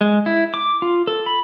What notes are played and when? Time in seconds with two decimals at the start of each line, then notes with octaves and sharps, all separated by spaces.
0.01 G#3
0.26 E4
0.54 D6
0.82 F4
1.07 A4
1.26 B5